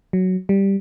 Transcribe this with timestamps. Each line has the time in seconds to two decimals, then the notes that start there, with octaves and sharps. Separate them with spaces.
0.13 F#3
0.49 G3